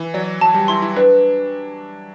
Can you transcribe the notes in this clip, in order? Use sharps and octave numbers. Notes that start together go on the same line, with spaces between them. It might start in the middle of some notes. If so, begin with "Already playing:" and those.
Already playing: E3
F#3 D5
F#3 A5
G3
E4 C6
E4
D4 B4